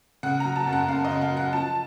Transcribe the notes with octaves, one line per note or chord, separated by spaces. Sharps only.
C#3 F#5
F#3 A#5
A5
F#2
F#5
F#2 F5
D#5
C#3
F5
F#3
F#5
F3 A5